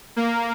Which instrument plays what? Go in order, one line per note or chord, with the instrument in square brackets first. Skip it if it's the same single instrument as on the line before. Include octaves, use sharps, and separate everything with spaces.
[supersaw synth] A#3